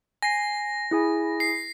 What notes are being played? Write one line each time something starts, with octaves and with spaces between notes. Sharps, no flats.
G#5 A#6 C7
E4 G#4 G#5
C7